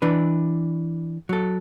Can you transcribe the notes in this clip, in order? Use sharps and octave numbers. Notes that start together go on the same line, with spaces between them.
E3 D4 B4
F#3 A4